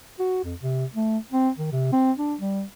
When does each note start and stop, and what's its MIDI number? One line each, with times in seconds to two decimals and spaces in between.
0.19 0.39 66
0.44 0.54 41
0.61 0.85 48
0.95 1.18 57
1.32 1.50 60
1.58 1.71 51
1.72 1.92 48
1.93 2.12 60
2.17 2.35 62
2.40 2.62 55